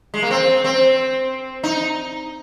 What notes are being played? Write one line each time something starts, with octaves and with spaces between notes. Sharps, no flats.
G#3
A#3
C4
C4
D#4